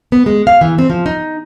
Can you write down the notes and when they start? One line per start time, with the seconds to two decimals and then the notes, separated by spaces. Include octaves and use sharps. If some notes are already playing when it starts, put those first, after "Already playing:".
0.12 B3
0.26 G#3
0.47 F5
0.61 E3
0.78 C4
0.90 F3
1.06 D#4